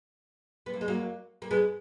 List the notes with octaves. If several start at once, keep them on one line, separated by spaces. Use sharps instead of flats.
B3
A#3
G#3
F#3 A#3
A#3
G#3 B3